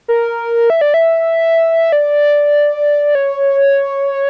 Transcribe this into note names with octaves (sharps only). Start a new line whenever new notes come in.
A#4
E5
D5
E5
D5
C#5